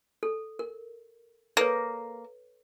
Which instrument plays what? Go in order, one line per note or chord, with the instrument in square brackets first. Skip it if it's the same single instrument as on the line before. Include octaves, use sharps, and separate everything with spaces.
[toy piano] A4
A#4
[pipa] A#3 [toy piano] A4 B4 C#5